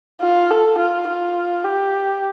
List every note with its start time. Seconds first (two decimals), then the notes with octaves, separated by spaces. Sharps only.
0.21 F4
0.51 A4
0.78 F4
1.08 F4
1.64 G4